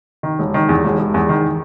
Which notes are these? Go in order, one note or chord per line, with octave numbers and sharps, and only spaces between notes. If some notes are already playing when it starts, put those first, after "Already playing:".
D#3
E1
D#3
E2
E1
E1
E2
D#3